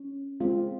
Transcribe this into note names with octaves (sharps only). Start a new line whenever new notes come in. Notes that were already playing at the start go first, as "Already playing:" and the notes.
Already playing: C#4
G#3 C4 F4